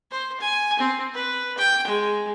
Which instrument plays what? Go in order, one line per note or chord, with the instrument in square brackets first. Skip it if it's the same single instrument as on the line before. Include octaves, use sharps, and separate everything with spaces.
[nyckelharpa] C5
G#5
C4
B4
G5
G#3